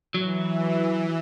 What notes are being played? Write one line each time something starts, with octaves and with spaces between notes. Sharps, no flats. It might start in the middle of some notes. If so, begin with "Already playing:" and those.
E3 F#3